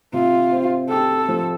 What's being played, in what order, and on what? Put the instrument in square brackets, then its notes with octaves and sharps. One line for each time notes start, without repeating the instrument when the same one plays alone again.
[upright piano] C3 [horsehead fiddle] F4
[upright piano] C4
[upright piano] G4 [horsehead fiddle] A4
[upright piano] F3